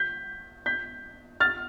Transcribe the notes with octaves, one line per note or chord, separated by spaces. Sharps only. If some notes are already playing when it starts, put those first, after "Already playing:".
Already playing: G6 B6
G6 B6
F6 A6